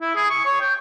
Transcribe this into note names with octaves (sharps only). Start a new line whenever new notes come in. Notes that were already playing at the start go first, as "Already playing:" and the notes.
E4
G#4
C#6
C#5
G5